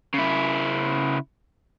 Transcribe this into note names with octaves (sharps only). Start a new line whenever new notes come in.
C#3 E4